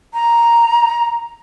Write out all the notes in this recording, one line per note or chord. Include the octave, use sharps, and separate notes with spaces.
A#5